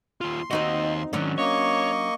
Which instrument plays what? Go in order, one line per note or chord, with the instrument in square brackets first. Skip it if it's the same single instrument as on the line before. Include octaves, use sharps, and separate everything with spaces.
[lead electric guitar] D#2 F4 [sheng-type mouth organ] C6
[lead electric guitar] D#2 D#5 [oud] C4 D#4 F#4
[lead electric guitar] G#2 D#3 [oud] F#3 C#4 D4
[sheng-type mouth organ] A#3 D#5 C#6 [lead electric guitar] C#5